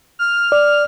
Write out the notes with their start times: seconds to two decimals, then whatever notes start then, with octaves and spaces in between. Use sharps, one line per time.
0.19 F6
0.52 D5